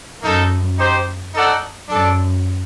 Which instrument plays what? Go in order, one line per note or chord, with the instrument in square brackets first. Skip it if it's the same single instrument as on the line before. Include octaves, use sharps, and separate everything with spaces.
[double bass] F#2 [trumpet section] A#3 D#4 A4
[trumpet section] D#4 G4 C5
D#4 A4 D5 F#5
[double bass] F#2 [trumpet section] D4 A4 D5